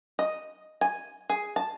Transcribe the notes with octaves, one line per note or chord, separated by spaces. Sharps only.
D#5
G#5
G#4
A5